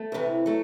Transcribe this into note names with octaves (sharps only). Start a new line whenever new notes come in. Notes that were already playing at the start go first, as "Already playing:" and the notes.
Already playing: A3
D2 C3 E3
F#3 A3